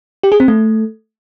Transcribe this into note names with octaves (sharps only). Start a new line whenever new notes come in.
G4
G#4
C4
A3